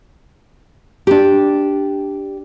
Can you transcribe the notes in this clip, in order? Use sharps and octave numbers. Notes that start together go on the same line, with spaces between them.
D4 G4